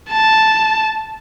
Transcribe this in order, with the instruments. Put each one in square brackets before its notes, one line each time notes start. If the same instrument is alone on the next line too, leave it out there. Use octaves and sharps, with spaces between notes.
[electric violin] A5